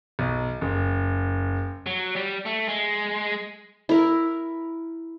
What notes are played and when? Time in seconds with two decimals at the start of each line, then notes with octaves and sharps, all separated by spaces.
0.19 B1
0.61 F#1
1.87 F#3
2.16 G3
2.46 A3
2.68 G#3
3.89 E4 A#4